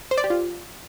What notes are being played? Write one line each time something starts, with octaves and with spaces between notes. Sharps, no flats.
C5
D5
G4
F4